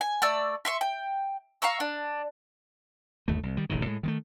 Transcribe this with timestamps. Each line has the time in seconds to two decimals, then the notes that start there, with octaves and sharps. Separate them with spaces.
0.01 G#5
0.22 A3 D5 E6
0.65 E5 C6 C#6
0.81 G5
1.62 F5 A#5 C#6 E6
1.80 D4
3.28 G1 D#2 A3
3.43 C2
3.57 D#3 G3
3.70 D1 A1 C3 D#3
3.85 A2 G#3
4.03 D#3 G#3 A3